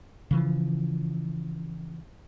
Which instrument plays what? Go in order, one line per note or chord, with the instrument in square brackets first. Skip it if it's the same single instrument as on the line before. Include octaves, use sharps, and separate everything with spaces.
[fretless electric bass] C#3 E3 F3